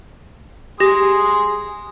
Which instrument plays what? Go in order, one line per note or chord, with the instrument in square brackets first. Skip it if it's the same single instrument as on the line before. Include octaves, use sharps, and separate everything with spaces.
[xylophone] G4 A#6 [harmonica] G#4 C6 D#6